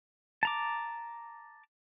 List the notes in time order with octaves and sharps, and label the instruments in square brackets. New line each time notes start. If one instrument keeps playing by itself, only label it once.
[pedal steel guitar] A5 A#5 D6